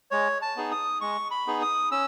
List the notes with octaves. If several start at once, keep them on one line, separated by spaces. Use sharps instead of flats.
G#3 C#5
A5
B3 D#4 G#4
D#6
G#3 C#6
B5
B3 D#4 G#4
D#6
C#4 E6